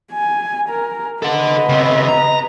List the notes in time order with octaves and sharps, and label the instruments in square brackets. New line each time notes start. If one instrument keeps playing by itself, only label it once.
[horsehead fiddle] G#5
A#4
[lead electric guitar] A4 F#5 [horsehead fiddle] B4 D#5
[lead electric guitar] C#3 C4
A#5